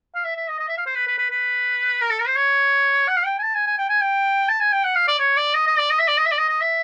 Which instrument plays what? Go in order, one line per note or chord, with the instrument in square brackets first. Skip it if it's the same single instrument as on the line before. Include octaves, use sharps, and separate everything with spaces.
[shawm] F5
E5
E5
D#5
D#5
E5
F5
C5
B4
B4
B4
B4
A#4
A4
A#4
C5
C#5
F#5
F5
G5
G#5
A5
G#5
G#5
G5
G#5
G5
A5
G#5
G5
F#5
F5
D5
C#5
D5
D#5
D#5
D5
D#5
E5
D5
D#5
E5
D5
D#5
D#5
E5